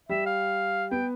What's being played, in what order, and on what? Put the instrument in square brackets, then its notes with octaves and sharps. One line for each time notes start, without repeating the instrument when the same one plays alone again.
[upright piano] G3 [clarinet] E5
[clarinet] F5
[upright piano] B3 [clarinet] G5